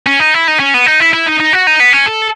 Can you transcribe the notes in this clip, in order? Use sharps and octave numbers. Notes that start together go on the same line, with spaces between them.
C#4
D#4
E4
D#4
C#4
B3
D#4
E4
E4
D#4
D#4
F#4
D#4
B3
C#4
A4